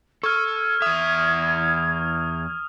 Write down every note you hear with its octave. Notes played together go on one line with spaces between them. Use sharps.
A4 C#6 F6 G#6
E2 E5 D#6